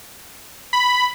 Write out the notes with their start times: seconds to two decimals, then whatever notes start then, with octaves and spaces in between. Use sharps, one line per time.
0.73 B5